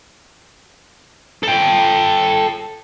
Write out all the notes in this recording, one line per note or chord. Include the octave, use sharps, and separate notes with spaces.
A4 G5